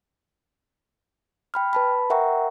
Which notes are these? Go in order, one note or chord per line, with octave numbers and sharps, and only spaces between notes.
G5 B5 F6
B4 A5 B5
A#4 E5 F#5 G5 A#5 C#6